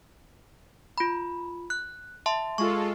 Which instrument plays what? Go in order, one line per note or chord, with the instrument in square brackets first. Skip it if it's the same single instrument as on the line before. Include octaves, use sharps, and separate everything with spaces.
[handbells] F4 B5
F#6
E5 A5 C6
[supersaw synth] G#3 F4 A4 [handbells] C#6